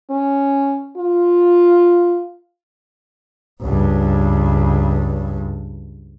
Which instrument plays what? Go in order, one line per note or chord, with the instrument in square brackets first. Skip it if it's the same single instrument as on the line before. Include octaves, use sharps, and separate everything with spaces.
[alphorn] C#4
F4
[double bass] C#2 G2